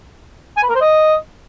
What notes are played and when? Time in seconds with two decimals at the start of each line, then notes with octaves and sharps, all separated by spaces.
0.57 G#5
0.63 B4
0.69 A#4
0.75 C5
0.81 D#5